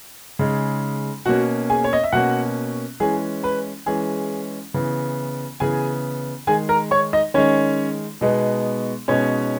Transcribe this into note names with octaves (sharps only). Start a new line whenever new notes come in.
C#3 G#3 D#4
B2 A#3 C#4 F#4 F#5
G#4 G#5
C#5
D#5
E5
B2 A#3 C#4 F#4 F#5
E3 G#3 C#4 G#4 G#5
B4 B5
E3 G#3 C#4 G#4 G#5
C#3 E3 B3
C#3 E3 B3 G#4 G#5
D#3 G#3 D#4 G#4 G#5
A#4 A#5
C#5 C#6
D#4 D#5
D#3 G#3 C#4 D#4 C#5
B2 G#3 B3 D#4
B2 G#3 B3 C#4 D#4 C#5